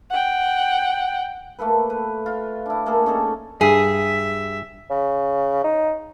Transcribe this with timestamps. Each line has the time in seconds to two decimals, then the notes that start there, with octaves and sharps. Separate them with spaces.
0.11 F#5 G5
1.59 A3 A#3 A4 B4
1.90 B4
2.26 F4
2.66 D4 E4
2.86 A3 A#3 G#4 A4
3.06 C#4 D#4 A4
3.61 G2 G#4 E5
4.90 C#3
5.64 D#4